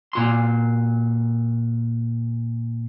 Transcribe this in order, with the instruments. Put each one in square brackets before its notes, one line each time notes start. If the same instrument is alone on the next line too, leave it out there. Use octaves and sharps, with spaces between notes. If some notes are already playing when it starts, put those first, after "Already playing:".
[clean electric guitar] A#2 F#4 C6